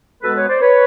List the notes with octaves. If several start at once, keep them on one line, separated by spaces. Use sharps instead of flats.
B2 G#3 B3 A4 B4
B4 C#5
C5 D5
B4 C#5